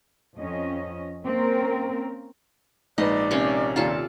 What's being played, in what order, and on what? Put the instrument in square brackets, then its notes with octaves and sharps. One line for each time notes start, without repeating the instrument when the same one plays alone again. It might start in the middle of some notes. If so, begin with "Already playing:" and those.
[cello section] F2 C#4 D#5
A#3 C4 C#4 A#4
[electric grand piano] A#1 D#4 [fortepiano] G#2 B4 [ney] D5 [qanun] D#5
[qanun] C3 A#3 C#4
[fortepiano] D#2 A#2 D5 [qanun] F4 A4 A5